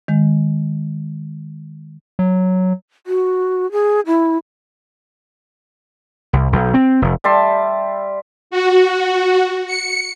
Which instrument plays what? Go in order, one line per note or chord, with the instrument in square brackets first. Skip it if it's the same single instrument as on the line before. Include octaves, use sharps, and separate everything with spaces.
[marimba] D#3 G#3
[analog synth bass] F#3
[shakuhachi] F#4
G#4
E4
[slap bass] C2
B1
C4
F1
[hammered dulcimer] G3 E5 A5 C6
[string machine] F#4
C#7